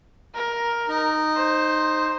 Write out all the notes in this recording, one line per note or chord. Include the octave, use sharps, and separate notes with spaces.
A#4
D#4
C5